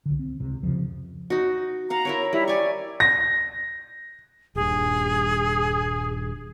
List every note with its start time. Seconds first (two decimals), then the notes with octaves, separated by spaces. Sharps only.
0.06 C2 D3
0.19 C4
0.40 C#2 C3
0.63 F2 C#3 F3
1.30 D#4 F#4
1.90 F5 F#5 A#5
2.05 E4 A#4 C#5
2.33 G3 E4
2.47 D5 G#5 C#6
3.00 A#6
4.55 D#1 G2 G#4